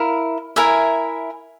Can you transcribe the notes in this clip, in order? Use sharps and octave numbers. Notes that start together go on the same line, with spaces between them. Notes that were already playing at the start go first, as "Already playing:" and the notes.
Already playing: E4 A#4 F5
E4 A#4 E5 G#5